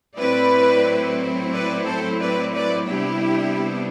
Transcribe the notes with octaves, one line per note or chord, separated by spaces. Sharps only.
A2 F#3 C4 E4 B4 D5
B4 D5
A4 C5
B4 D5
B4 D5
C3 G3 B3 D4 E4 G4